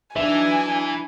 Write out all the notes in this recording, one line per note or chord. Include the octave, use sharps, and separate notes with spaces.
E3 F#3 D4 D#4 E5 G#5